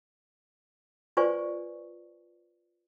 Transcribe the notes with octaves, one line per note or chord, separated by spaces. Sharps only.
F4 B4 C5 D5 G#5 C#6